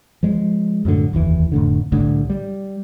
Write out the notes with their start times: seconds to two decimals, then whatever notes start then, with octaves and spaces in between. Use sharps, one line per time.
0.23 F3 G#3
0.85 F#2 A2 D3
1.13 F1 D#2 E3
1.52 F1 A2 D3
1.92 C2 A2 D3
2.30 G3